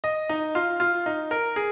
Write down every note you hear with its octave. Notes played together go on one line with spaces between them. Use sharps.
D#5
D#4
F4
F4
D#4
A#4
G#4